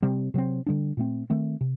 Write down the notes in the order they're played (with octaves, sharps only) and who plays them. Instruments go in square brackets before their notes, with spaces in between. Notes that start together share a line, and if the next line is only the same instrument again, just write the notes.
[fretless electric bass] C3 G3 C4
C3 F#3 C4
D3 G3 D4
A#2 A3 C4
D#3 A3 C4
C3